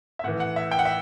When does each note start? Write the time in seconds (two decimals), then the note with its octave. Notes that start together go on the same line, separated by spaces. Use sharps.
0.19 E5
0.24 A2 F#5
0.28 E3
0.40 F#5
0.56 E5
0.71 G5
0.79 F#5
0.85 E5